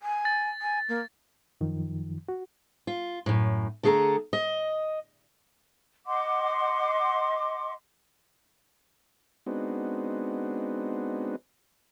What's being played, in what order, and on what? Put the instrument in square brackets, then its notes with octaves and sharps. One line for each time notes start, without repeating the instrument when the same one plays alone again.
[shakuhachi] G#5
[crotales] A6
[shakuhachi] G#5
A#3
[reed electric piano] F#2 D#3 F3
F#4
[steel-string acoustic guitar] F4
F#2 A2
D3 A3 G#4 A4 A#5
D#5
[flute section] D#5 F#5 C6 D6
[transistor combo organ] G#3 B3 C4 D4 D#4 F#4